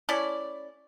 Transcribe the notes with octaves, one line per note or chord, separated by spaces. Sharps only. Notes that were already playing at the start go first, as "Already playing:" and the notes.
A3 C#4 E4 D5